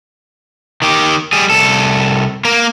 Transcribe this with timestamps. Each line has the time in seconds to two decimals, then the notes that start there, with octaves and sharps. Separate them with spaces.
0.82 D#3 G4
1.33 G3 G#4
1.50 C2 A4
2.45 A#3 A#4